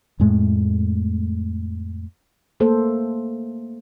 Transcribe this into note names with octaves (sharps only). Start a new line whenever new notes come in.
F2 A2 G#3 A3
A3 A#3 A4 C5